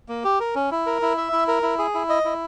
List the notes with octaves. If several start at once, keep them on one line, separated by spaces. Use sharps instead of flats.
A#3
G4
A#4
C#4
E4
A#4
E4
E5
E4
A#4
E4
G#4
E4
D#5
E4